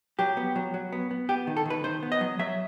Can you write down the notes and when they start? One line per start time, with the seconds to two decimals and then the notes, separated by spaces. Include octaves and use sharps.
0.19 F#3 G4
0.37 B3
0.56 F#3
0.74 F#3
0.93 B3
1.11 B3
1.29 B3 G4
1.47 D#3
1.57 A4
1.66 D#3 B4
1.84 D#3 C5
2.03 B3
2.12 D#5
2.21 F#3
2.39 F#3 E5